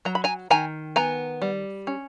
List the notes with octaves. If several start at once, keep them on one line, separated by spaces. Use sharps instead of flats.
F#3 A#5
B5
G#5 A#5
D#3 G#5 A#5
B3 G#5 A#5
G3
C#4